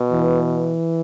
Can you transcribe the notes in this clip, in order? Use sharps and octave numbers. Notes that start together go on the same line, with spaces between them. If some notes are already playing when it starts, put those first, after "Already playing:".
Already playing: B2
E3